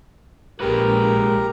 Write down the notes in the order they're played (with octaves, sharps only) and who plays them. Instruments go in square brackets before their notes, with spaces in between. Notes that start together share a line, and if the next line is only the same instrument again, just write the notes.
[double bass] A#1 [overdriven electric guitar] G#3 B4 [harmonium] G4 A#4 A#5